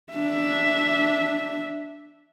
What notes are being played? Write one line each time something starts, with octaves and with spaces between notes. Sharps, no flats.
D4 E5